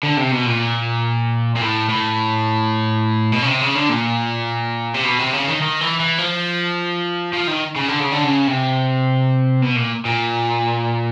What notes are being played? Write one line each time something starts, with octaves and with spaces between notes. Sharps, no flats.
D3
C3
B2
A#2
A#2
A2
A2
B2
C#3
C3
C#3
D3
A#2
C3
B2
C3
C#3
D#3
D#3
E3
E3
F3
F3
D#3
C#3
D3
C#3
D3
C#3
C3
B2
A#2
A#2